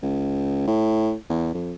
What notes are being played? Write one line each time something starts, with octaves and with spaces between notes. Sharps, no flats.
C#2
A2
E2
F2